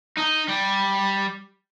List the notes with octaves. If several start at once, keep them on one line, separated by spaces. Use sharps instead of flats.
D#4
G3